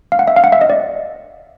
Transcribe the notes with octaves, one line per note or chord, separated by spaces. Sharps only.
F5
F#5
E5
F5
F#5
E5
D#5
D5